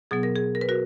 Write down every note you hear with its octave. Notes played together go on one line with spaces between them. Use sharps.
B2 F#3 B3 G#4
A#4
G#4
A#4
B4
F#4 A#4